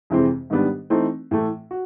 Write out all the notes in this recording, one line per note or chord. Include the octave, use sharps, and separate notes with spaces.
F2 C3 E3 G#3 C4
G#2 D#3 G3 B3 D4
E3 A3 C4 D#4
A2 E3 A3
F#4